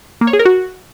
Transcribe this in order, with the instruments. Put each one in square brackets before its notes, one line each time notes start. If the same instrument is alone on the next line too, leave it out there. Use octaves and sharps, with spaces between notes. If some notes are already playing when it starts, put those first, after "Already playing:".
[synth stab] A#3
C#5
G#4
A#4
F#4